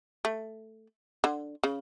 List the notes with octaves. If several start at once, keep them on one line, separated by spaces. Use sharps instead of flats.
A3
D3
C#3